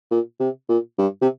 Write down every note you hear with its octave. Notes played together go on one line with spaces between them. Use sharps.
A#2
C3
A#2
G2
C3